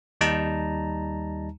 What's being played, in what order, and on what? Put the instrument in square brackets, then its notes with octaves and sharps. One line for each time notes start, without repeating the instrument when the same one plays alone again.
[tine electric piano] D#2 G3 D#4 A5 A#5